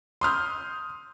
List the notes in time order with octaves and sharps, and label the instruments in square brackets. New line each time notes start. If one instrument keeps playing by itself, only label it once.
[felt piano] C6 D#6 F6 G6